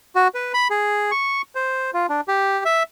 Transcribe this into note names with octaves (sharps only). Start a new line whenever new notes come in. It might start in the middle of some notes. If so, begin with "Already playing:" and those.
F#4
B4
B5
G#4
C#6
C5
F4
D4
G4
E5